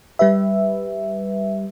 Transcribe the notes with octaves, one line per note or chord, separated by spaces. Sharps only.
G3 G4 B4 E5